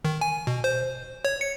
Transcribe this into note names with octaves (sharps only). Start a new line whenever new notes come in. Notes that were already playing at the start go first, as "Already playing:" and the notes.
D#3
G#5
B2
C5
C#5
C#7